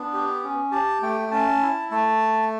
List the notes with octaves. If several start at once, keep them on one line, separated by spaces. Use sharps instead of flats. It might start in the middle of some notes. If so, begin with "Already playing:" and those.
Already playing: B3 D4
G4
C#4
G4 A5
A3 G5
C#4 A5
E4
A3 A5